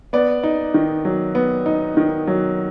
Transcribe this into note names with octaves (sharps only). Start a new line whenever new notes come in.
B3 D5
D#4
D#3
F#3
B3
D#4
D#3
F#3